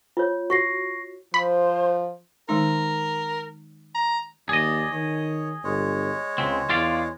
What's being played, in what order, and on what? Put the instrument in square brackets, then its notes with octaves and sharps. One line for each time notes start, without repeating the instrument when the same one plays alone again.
[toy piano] F4 C#5
[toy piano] F#4 [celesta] C#6 A#6 C7
[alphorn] F3 [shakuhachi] C5 [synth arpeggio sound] B5
[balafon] D#3 G#3 D#4 [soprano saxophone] A#4
[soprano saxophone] A#5
[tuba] D#2 [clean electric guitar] G#4 D#5 [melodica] D5
[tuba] D#3 [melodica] C#5
[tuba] G1 [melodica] G#3 C#5
[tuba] C#2 [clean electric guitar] C#3 C4
[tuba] E2 [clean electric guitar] F4 D5 F5